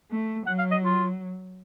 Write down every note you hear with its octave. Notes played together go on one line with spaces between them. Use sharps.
A3
F#3 F#5
F5
D#5
F4